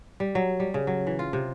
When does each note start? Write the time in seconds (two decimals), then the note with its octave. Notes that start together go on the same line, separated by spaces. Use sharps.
0.20 G3
0.35 F#3
0.60 G3
0.74 C#3
0.87 F#3
1.07 E3
1.19 F4
1.33 C3